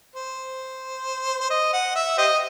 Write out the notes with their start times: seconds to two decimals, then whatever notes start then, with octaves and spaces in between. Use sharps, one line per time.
0.16 C5
1.40 C5
1.50 D#5
1.73 F#5
1.95 E5
2.18 G4 C5 D#5